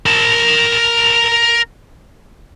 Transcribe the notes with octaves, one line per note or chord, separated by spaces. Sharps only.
A#4 A5